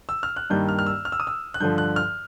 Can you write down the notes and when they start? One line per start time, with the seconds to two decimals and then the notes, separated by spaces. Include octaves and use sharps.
0.09 E6
0.23 F6
0.36 F#6
0.50 G2 D#3 G3 A#3 G6
0.69 F6
0.79 F6
0.86 E6
1.05 F6
1.12 E6
1.20 D#6
1.27 E6
1.54 F#6
1.60 G2 D3 F3 G6
1.78 F#6
1.96 F6